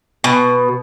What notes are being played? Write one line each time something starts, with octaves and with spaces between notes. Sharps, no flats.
B2